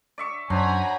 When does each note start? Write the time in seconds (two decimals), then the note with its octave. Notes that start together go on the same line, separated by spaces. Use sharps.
0.18 D5 E5 C#6
0.50 F#2 F#3 D4 C5 G#5 A#5 B5